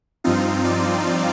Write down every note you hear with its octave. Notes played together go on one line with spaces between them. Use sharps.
G2 F3 C4 D#4 F4
D5